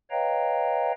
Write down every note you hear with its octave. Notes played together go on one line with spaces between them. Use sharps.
B4 C#5 D#5 F5 G5 A#5